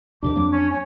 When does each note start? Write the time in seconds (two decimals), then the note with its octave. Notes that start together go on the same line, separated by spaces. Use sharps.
0.23 D#2 C3 D#3 D4 D6
0.36 F2 F#3 A#3
0.51 C#4
0.71 C#5 G#5